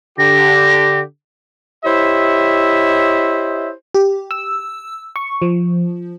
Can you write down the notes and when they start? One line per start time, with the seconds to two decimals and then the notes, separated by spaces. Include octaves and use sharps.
0.19 D3 G4 A#6
1.85 E4 G4 C5 C#5 D#5 E5
3.94 G4
4.31 E6
5.16 C#6
5.42 F3